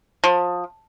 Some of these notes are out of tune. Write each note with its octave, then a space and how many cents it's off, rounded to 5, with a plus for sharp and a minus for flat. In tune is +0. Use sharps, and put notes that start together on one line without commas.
F3 +25